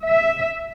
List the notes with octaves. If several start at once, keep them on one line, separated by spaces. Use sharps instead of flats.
E5